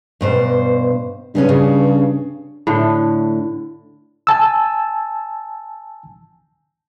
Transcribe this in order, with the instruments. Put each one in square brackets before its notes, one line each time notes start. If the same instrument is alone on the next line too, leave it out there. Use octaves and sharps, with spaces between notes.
[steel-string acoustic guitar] G2 B2 C5
[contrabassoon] G2 [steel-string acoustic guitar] C#3 B3 C#4
[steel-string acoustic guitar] C#3
[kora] A2 D3
[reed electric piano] G#5 A5 E6